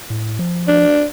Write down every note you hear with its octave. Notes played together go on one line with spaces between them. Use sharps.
A2
F3
D4